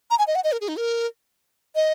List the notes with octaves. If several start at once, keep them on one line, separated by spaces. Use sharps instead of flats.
A#5
G#5
D#5
F#5
D#5
A#4
G#4
D#4
A#4
D#5